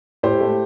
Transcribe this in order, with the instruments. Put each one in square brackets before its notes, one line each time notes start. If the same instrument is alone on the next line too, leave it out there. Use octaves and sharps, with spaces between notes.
[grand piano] A2 G4 C5
A3